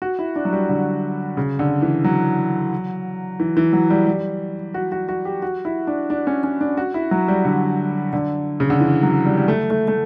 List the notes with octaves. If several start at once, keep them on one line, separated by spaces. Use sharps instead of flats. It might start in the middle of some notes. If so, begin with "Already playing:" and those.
F#4
E4
D4
F#3
G3
D3
C#3
D3
E3
F#3
E3
E3
F#3
G3
G3
F#4
F#4
F#4
G4
F#4
E4
D4
D4
C#4
C#4
D4
F#4
E4
F#3
G3
D3
D3
C#3
D3
E3
F#3
G3
G3
A3
A3
A3